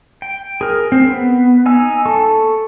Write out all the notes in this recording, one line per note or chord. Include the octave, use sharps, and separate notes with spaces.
G5
G#4 A#4
C4
B3
D#4 G#5 E6
A4 A5 C#6